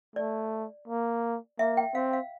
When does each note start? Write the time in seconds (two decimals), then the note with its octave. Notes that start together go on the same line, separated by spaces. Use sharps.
0.16 A3 D5
0.88 A#3
1.59 A#3 E5
1.77 G5
1.94 C4 F5
2.13 F5